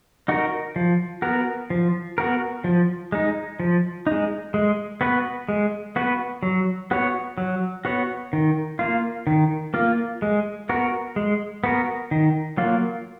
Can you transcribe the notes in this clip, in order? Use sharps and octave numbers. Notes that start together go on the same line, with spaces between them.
D#4 F#4 A#4
F3
B3 F#4 A#4
F3
B3 F#4 A#4
F3
G#3 D#4
F3
G#3 D#4
G#3
B3 F#4 B4
G#3
B3 F#4 B4
F#3
B3 F#4 C#5
F#3
B3 F#4 C#5
D#3
A#3 F4
D#3
A#3 F4
G#3
B3 F#4 A#4
G#3
B3 F#4 A#4
D#3
F#3 A#3 F4